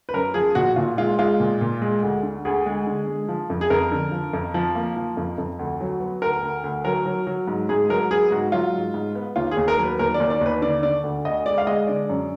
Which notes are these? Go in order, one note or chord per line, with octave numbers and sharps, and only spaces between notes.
B4
F#2 A#4
F3 G#4
A#2 F#4
A#2 F4
G#3 F4
G#3 F4
A#2
A#2
G#3
D2
D3
D2 G#4
G#3
D3
G#3
F3
F2
G#4
F2 A#4
D3
F3
F2
F3
A#3
F3
F2
F2
D2
F#3
B3
D2 A#4
D2
D2
F#3 A#4
F#3
F#3
G#2
G#2 G#4
F#3 A#4
B3 G#4
G#2 F#4
F#3 F4
G#2
G#2
B3
D#2 F4
G#4
D#2
A#4
F#3
B4
D#2 A#4
D5
D#2
D5
D#2 B4
D3 D5
D3 D5
D2
D2 D#5
G#3 D5
F5
G#3 D#5
D3 D5
F#2